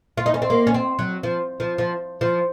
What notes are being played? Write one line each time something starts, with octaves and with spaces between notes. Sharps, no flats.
F4
D#4
C#4
C4
A#3
C#4
C4
F#3
F3
F3
F3
F3